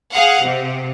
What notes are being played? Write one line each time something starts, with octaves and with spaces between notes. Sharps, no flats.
G#4 F5 F#5
C3